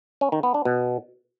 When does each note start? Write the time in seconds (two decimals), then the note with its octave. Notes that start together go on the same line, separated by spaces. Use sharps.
0.21 C#4
0.32 D#3
0.43 B3
0.54 D4
0.65 B2